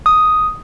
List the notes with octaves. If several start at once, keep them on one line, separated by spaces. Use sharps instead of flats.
D#6